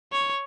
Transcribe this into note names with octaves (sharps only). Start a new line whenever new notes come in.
C#5